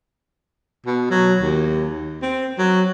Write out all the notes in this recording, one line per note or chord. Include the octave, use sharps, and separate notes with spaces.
B2
F#3
D#2
C4
F#3